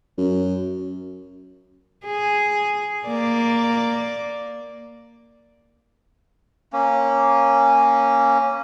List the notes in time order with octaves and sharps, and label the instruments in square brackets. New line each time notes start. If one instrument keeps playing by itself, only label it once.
[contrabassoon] F#2
[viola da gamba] G#4
A#3 D5
[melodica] A#3 C#4